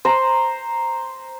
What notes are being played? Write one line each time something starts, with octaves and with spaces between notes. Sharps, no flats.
C5 A#5